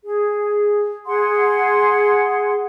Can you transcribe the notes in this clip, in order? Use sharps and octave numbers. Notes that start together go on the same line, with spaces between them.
G#4
G#4 F#5 C6